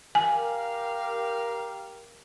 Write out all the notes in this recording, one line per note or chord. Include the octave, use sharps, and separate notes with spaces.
G4 A#4 F5 G#5